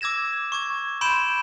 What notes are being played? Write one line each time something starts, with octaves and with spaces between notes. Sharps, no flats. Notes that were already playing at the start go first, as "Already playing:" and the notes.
D6 E6 G#6 A#6 E7
C#6 D6 G#6
B5 C6 G6 D7 E7